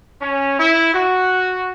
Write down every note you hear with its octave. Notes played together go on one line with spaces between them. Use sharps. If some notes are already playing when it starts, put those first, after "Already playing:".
C#4
E4
F#4